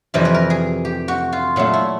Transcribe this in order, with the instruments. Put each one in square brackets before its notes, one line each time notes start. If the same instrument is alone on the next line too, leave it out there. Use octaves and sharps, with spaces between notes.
[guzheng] F2 C3 E3 G3 A#4
B4
A#4
G#4
G4
F#4
F4
A#2 F#3 A3 F4
E4